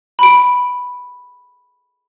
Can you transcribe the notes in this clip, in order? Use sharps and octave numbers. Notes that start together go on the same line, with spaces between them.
B5 D7